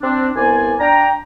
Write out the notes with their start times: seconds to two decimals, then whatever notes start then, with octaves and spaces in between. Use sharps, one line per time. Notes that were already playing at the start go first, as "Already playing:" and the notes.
0.02 C4 D4
0.36 C2 G2 B3 C5 D5 G#5
0.79 D4 G5 A#5